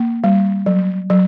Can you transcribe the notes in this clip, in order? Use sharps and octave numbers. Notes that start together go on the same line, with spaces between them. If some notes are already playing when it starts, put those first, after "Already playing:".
Already playing: A#3
G3
F#3
F#3